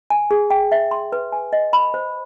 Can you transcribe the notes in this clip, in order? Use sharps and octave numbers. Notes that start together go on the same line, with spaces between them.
G#5
G#4
G5
E5
C6
B4
G#5
D#5
B5
C5